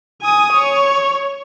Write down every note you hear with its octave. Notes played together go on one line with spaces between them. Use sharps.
G#5 D#6
C#5